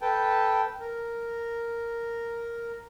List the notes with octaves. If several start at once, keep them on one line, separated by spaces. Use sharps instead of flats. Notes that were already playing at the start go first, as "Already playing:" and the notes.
A4 B4 G5 A5
A#4